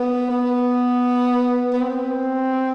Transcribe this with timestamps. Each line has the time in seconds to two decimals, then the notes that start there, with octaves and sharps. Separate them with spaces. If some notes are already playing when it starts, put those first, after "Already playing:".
Already playing: B3
0.31 B3
1.73 B3
1.81 C4